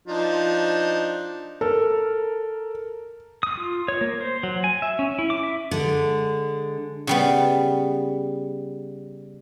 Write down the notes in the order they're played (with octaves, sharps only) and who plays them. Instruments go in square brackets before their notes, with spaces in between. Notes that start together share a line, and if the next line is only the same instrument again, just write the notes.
[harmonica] F3 D4 D#4
[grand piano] A4 [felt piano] A#4
[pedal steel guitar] D#6
F4
C#5
A#3
C5
F#3
G#5
E5
C#4
E4
D6
E5
[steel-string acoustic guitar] D3 G#3
[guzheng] C#3 G3 B3